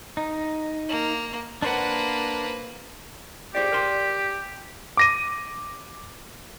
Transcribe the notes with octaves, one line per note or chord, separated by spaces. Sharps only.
D#4
A#3
A#3 D4 B4 C5 F#5
G4 G#4 C5 D5
A#4 D5 C6
D6 A#6 D#7